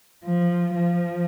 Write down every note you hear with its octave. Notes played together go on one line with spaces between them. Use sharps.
F3
F3